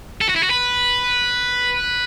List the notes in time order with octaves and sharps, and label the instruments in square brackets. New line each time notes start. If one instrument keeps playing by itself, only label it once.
[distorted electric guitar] A4
F#4
E4
F#4
B4